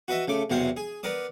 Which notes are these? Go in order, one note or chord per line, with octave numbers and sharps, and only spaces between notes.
F#4 B4 D#5 E5
C#3 A3 D6
B1 E2 C3 F#3 C5 F5
G#4
B3 A#4 D5 D#6